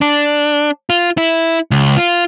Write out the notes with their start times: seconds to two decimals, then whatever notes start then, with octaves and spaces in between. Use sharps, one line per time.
0.01 D4
0.90 F4
1.18 E4
1.71 C#2
1.97 F4